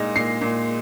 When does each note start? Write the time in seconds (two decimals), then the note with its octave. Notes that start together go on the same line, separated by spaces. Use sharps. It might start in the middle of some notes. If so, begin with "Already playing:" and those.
Already playing: A#2 G#3 D#4 A#6
0.16 A#2 C7
0.42 A#2